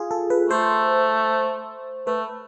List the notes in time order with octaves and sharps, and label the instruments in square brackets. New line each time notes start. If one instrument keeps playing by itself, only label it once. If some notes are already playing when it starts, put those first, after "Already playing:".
Already playing: [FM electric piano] F4 G#4
A4
B4
[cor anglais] A3 [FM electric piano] C5
[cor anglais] A3 [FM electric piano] B4